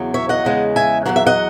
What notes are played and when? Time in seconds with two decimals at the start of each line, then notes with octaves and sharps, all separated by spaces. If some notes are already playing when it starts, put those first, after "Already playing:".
Already playing: E2 C#3 F#3
0.14 C#5 E5
0.29 D#5 F#5
0.45 E2 C#3 G#3
0.76 E5 G#5
1.05 E2 B2 F#3 F#5
1.16 E5
1.26 D#5 F#5